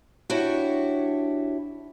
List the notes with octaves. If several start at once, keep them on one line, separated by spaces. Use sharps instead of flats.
D4 E4 F#4 G4 C#5